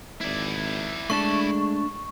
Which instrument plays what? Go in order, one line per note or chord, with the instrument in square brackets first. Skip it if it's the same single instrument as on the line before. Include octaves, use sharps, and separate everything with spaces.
[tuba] G#1 [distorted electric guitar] E4 D5
[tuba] G#3 [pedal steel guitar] A3 D4 A5 [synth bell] C#6